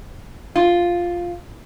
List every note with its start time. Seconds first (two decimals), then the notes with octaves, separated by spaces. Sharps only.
0.55 F4